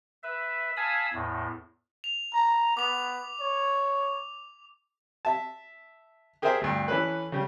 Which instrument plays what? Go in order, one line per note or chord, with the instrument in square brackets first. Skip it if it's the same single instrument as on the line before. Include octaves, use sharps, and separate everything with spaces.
[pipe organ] B4 E5
F5 G#5 A5 B5 D#6 E6
E2 A2
[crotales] F7
[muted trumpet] A#5
[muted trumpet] B3 [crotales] D6 F7
[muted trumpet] C#5
[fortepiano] E5 A5
G4 G#4 A#4 C5 E5 G#5
D2 G2
E3 C#4 A4 B4
C#3 G3